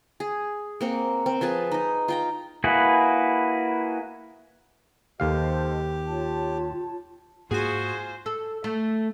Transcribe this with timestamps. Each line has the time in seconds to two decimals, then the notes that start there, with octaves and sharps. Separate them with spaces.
0.20 G#4
0.81 A#3 C4 F#5
1.26 C4
1.41 F3 G#4 B4 A5
1.71 D#4 D#5
2.08 F4 G5 A#5
2.64 A#3 E4 F#4 G#4 B4
5.20 D#2 G4 A4 C5 D#5 F5
6.08 F4 C#5 A5
7.51 G#2 A#3 F4 F#4 G#4 C5 G#5
8.26 A4
8.64 A3